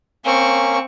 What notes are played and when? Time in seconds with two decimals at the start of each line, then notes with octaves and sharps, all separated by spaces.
0.25 A#3 C4 C#4 C#6